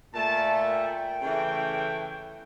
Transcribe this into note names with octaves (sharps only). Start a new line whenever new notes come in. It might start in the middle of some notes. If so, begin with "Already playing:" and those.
A#2 A3 A5
G5
C#3 E3 A3